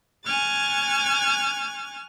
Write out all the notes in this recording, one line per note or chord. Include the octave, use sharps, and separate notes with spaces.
G#5 C#6 F6 F#6 G#6 A6